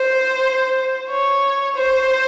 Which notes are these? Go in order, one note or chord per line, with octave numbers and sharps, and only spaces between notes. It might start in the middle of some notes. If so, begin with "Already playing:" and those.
Already playing: C5
C#5
C5